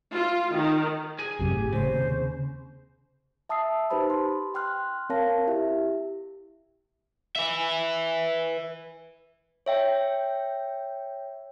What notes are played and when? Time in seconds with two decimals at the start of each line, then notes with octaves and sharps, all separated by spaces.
0.14 F4
0.54 D#3
1.19 G#4 G#5
1.39 A1 F#2 C3 G4
1.52 G1 A2
1.73 A2 C#3 C5
1.84 D#2 C3
3.49 E5 A5 D#6 E6 C7
3.90 D#4 G4 B4 C5 A5 B5
4.10 C6
4.55 G5 C6 F6 F#6
5.09 C4 A#4 C#5 F5 A5 A#6
5.48 E4 G4 E5
7.36 B4 E5
9.66 C#5 E5 G5